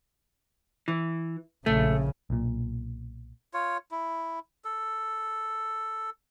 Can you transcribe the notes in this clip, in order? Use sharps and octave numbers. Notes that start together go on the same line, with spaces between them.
E3
A#1 C#3 A3
B1 A#2
F4 C#5
E4
A4